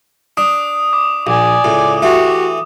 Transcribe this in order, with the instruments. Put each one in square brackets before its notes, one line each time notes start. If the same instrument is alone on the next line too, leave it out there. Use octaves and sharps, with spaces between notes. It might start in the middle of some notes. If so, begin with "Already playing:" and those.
[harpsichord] D4 [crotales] D#6
[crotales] D6
[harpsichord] A#1 [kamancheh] D5 G#5
[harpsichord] C#2 A2
[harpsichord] E3 A3 [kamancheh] F#4 G4